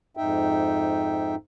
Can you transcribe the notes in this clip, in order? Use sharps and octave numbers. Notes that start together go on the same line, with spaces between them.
F2 G#2 D#4 E5 G5